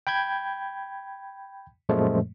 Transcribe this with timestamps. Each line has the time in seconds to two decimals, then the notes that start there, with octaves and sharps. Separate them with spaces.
0.07 G5 B5 G6 G#6
1.89 F#2 A#2 F3 G#3 A3